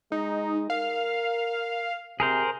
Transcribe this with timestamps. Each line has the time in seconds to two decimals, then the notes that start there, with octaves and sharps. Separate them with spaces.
0.12 G#3 D#4
0.70 A#4 F5
2.20 C3 G#4 A#4 C5